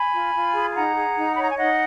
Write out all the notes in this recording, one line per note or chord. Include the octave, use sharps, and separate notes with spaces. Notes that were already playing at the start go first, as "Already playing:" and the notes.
Already playing: G#5 B5
F4
F4
G#4
B5
D#4 F#5 A#5
G#4
D#4
B5
C#5 A#5
G#5
D#4 D#5 F#5